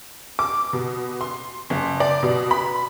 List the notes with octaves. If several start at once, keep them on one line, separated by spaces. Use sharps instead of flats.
D6
B2
C6
F#1
D5
B2
B5